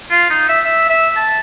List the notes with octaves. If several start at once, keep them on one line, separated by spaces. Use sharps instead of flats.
F4
D#4
E5
E5
E5
A5